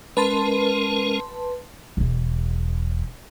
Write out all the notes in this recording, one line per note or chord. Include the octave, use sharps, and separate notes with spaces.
G#3 C#4 A#4 B4 A5 C6
E1 E2